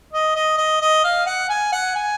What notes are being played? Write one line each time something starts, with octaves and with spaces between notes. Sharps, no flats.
D#5
D#5
D#5
D#5
F5
F#5
G#5
F#5
G#5